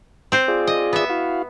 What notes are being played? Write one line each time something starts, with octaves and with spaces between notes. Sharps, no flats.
C4 C5
F4 G#4 D5
D#5
B3 E5
E4 F#4 F5